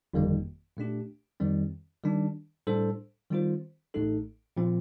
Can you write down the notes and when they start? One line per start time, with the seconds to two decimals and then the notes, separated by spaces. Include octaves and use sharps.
0.14 G1 F2 D#3 G3 A#3
0.77 A#2 A3 D4 G4
1.40 F2 D#3 G3 C4
2.03 D#3 G3 D4
2.67 A2 G3 D4 A4 C5
3.30 D#3 G3 C4 F4 C5
3.94 A1 A2 A3 D#4 A4
4.57 A#2 F3 C4